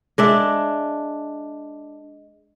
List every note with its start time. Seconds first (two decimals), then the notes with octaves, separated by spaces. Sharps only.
0.18 G#3 D4 E5